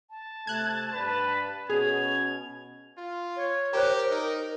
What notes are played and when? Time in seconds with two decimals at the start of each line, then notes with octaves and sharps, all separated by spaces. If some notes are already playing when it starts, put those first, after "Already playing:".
0.10 A5
0.47 C3 A3 F#6 G#6
0.93 G2 B4
1.70 B2 C#4 G#4 G#6 F7
2.98 F4
3.36 C#5
3.73 G4 A#4 C5 C#5 A#5
4.11 D#4